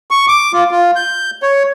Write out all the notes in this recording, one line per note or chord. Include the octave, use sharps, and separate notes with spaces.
C#6
D6
F4
F4
G6
C#5